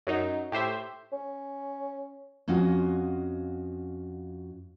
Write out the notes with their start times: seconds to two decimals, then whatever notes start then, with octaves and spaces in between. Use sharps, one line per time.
0.07 F#2 F#3 D#4
0.52 A2 G4 C5 E5
1.13 C#4
2.48 F2 C#4 F4 F#4 D#5